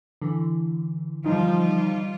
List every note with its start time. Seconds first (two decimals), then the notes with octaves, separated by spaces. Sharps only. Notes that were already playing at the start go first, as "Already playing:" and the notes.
0.22 D3 E3
1.25 F3 G3 D#4 F4